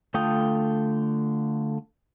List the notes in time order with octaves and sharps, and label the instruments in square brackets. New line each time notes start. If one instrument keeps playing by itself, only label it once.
[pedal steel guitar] D3 A3 F4 G5 D#6